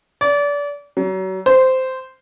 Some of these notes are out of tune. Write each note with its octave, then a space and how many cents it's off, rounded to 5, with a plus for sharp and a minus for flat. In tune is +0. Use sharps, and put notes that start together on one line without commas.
D5 -30
F#3 +35
C5 -10